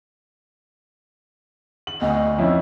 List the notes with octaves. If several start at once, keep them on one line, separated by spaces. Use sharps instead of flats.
F#7
D2 D#5
F2 C#4 E4